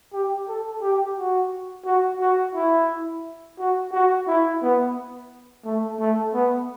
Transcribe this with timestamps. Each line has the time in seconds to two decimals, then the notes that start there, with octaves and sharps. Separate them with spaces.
0.14 G4
0.49 A4
0.82 G4
1.17 F#4
1.85 F#4
2.21 F#4
2.55 E4
3.59 F#4
3.92 F#4
4.27 E4
4.62 B3
5.65 A3
6.00 A3
6.34 B3